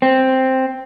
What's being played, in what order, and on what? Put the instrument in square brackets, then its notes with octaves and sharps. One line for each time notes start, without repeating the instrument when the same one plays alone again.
[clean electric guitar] C4